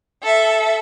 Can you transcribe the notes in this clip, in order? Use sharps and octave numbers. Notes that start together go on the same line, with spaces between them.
A4 E5